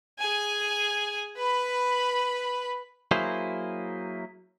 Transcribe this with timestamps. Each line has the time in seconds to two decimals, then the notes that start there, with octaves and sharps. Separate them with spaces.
0.19 G#4 G#5
1.37 B4 B5
3.11 F#3 A#3 E4 G#4 C5